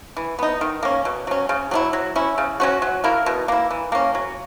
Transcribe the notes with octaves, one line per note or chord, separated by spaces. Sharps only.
E3
B3 D#4
D#3
A#3 C#4
B2
F#3 C#4
C#3
F#3 C#4 E4
F#3
C#4 E4
C#3
F#3 C#4 F#4
F#3
A#3 E4 A#4
B2
A#3 E4
E3
A#3 C#4
F#3